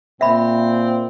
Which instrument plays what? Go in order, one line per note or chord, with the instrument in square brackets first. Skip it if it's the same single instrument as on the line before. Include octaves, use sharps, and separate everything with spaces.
[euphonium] A#2 [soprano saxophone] C4 [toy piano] E5 B5